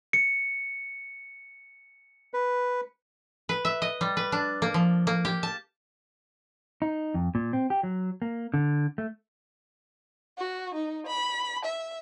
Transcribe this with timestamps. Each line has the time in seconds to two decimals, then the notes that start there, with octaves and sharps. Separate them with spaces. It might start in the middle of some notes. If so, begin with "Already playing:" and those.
0.13 C#7
2.34 B4
3.49 B4
3.65 E5
3.82 D#5
4.01 G3
4.17 B4
4.32 D4
4.62 A#3
4.74 F3
5.07 A#3
5.25 G4
5.43 A5
6.82 D#4
7.14 F2
7.35 A#2
7.53 C4
7.70 G4
7.83 F#3
8.22 A#3
8.54 D3
8.98 A3
10.38 F#4
10.75 D#4
11.06 B5
11.65 E5